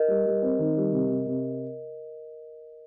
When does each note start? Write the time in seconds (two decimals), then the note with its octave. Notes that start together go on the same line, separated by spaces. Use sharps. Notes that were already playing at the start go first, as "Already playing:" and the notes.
Already playing: A#4 D#5
0.08 G3
0.26 G3
0.42 C4
0.59 D#3
0.77 G3
0.92 C3
1.09 C3
1.26 C3